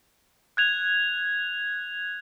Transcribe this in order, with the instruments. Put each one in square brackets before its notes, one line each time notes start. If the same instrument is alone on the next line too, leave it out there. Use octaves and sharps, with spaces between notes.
[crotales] F#6 G#6 F7